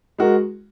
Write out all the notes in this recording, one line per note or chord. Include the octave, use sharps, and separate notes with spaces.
G#3 F#4 A#4